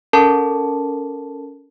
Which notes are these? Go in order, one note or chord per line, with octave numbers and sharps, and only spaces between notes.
C#4 A4 A#4 A5